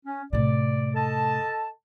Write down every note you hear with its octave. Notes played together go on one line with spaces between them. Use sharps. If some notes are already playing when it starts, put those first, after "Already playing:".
C#4
A2 C3 D5
A4 D#5 A5